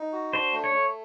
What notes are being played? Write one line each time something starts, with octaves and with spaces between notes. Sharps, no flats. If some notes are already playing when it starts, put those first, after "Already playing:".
Already playing: D#4
F#4
D4 C5
A3
C#5
A3